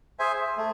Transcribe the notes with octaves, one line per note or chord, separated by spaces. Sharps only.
G#4 C5 E5 G#5
A3